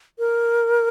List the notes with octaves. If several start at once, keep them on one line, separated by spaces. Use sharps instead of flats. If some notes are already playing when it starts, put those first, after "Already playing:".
A#4